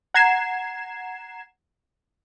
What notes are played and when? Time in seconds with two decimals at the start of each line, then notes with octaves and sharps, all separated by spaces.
0.14 F#5 A#5 G#6 C7 E7